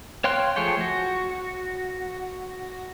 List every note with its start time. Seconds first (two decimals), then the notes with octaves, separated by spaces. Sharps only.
0.24 C#5 F5 G5 C6 F#6
0.56 F3 A3 G#4 C#5 G5
0.81 F#4